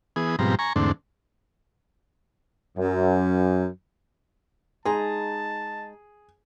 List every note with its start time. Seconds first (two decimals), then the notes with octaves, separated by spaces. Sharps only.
0.16 E3 B3 G#4 D#6
0.39 G#2 B2 F3 G3 C4 A#5
0.59 G#5 A#5 C#6
0.76 E2 G#2 D3 A3 C4 D4
2.77 F#2
4.85 G#3 D#4 G#4 A5 A#5